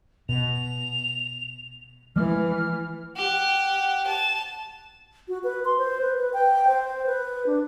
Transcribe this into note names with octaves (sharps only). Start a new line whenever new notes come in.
B2 F7
E3 F3 G#3 A3 F6
G4 F#5
A5
F#4
B4
C6
C5
B4
B4
G5
C5
B4
D4